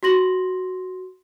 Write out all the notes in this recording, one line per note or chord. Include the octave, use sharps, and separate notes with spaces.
F#4 C6 A#6 F#7